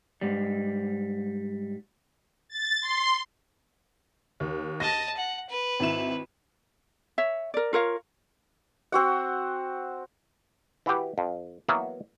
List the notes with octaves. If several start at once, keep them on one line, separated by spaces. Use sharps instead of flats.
G#2 G3
A6
C6
D#2
D#5 A5 A#6
F#5
B4
G#1 E4 E7
C#5 E5
A#4 D5
F4 A#4 C#5 F5
C4 F#4 F#5
E3 E4 F#4 G4 B4
F2
E3 F#3 A#3 B3 E4 F#4